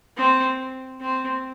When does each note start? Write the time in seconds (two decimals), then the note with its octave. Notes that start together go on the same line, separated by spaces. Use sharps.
0.17 C4
1.01 C4